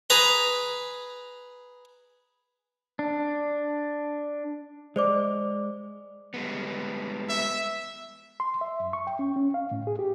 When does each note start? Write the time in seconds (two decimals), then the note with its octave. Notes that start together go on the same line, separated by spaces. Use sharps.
0.10 G#4 B4 A#5 C6
2.99 D4
4.96 G#3 C5 D5 D6
6.34 G3 G#3 B3
7.29 E5
8.40 C6
8.61 E5
8.80 F#2
8.93 C#6
9.07 G5
9.19 C#4
9.36 C#4
9.54 F5
9.71 A2
9.87 G#4
9.99 G4